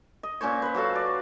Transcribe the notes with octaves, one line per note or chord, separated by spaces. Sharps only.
D#5
A#2 C#4 C5 C#5
B4 C5
F#3 F#4 A4 F5
D5